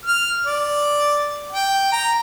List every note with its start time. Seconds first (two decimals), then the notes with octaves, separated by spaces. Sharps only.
0.06 F6
0.47 D5
1.52 G5
1.93 A#5